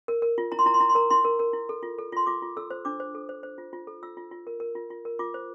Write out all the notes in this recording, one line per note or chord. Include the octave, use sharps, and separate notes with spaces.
A#4
A#4
F4
E4 A#5
C6
E4 A#5
C6
E4 A#5
C6
A#4 A#5
E4 C6
A#4
A#4
E4
A4
F4
A4
F4 C6
F4 D6
F4
A4 E6
C5
D4 D6
C5
A4
C5
C5
F4
F4
A4
F4 E6
F4
F4
A#4
A#4
F4
F4
A#4
F4 D6
C5